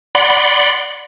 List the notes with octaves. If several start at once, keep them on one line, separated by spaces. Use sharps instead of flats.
D5 F#5 B5 C6